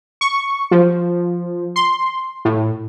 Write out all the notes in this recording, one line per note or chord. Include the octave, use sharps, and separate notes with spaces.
C#6
F3
C6
A2